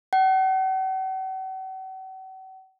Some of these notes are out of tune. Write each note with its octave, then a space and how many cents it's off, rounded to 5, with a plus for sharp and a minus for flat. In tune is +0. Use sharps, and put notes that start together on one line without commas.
F#5 +45